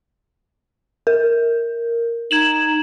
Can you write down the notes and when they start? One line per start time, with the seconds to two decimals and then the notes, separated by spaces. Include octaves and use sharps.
1.07 A#4
2.31 D#4 G#6 E7 F#7